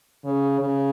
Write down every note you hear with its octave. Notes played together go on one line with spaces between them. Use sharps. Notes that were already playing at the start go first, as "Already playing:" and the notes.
C#3
C#3